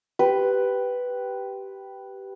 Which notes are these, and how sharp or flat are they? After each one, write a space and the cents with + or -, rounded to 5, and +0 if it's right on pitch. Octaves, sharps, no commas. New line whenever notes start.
G4 -10 B4 +0 C6 +0